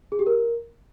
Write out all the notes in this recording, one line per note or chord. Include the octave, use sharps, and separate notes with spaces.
G#4
G4
A#4